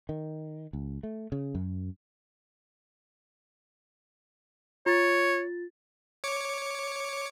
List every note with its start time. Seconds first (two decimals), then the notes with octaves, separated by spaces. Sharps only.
0.09 D#3
0.73 C#2
1.03 A3
1.32 C#3
1.55 F#2
4.86 F4 C#5 A6
6.24 C#5 D6 C#7